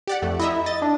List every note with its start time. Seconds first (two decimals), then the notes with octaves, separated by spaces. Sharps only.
0.07 G4 D5 F#5
0.22 F2 A3
0.39 E4 D#5 E5 A#5
0.66 D#5 A6
0.82 D4